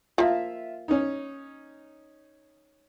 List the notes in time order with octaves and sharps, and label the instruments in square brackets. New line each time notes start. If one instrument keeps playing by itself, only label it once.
[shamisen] F3 A#3 [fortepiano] F4 E5
[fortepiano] C#4 D#4